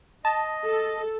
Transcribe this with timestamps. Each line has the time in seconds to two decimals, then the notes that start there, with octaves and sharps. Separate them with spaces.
0.25 D#5 A5
0.65 A4